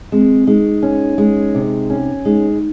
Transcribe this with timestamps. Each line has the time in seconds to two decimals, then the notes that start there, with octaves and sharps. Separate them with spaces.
0.12 G#3 C4
0.47 G#3 D#4
0.83 C#4
1.18 G#3
1.55 C3
1.90 C#4
2.25 G#3 D#4